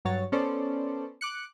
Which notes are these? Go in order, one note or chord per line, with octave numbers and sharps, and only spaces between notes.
G2 F#3 F#4 C#5 A6
B3 C#4 A4 C5 D5
D6 F#6 C#7